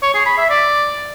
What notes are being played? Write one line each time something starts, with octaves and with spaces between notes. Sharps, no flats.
C#5
G#4
B5
E5
D5